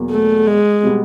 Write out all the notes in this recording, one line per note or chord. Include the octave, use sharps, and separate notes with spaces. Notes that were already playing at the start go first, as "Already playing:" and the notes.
Already playing: E2 B2 F#3 A#3
A3
G#3
B2 G3 B3